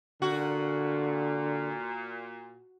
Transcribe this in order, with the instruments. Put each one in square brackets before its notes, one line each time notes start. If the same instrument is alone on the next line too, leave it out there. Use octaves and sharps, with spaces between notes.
[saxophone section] A#2 [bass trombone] D3 [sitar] F#4